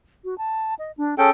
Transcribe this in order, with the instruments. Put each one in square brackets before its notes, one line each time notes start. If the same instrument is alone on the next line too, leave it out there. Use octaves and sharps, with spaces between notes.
[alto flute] F#4
A5
D#5
D4
[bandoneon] C#4 A4 G5 [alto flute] G#4